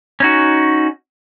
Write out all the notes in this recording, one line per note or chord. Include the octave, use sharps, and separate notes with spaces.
C#4 D#4 F#4